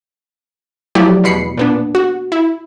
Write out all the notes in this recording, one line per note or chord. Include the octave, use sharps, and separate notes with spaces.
F3 F#3 A3 E4 G4 D5
E2 B2 B5 C7 C#7
A#2 B3 D4
F#4
E4